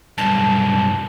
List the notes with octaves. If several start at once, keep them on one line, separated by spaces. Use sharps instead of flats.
B1 G2 A5